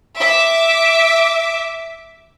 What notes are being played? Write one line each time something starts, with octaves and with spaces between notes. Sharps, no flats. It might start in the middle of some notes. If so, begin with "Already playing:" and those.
E5 D6